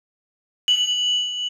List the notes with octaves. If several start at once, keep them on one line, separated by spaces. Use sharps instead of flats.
F#7